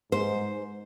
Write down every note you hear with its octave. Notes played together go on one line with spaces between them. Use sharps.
G#2 C5